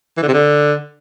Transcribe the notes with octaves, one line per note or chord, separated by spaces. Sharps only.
E3
D3
C3
D3